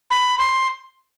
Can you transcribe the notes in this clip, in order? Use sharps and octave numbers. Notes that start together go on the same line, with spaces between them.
B5
C6